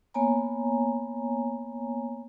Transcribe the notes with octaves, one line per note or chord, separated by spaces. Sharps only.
A#3 B3 C#5 G#5 A#5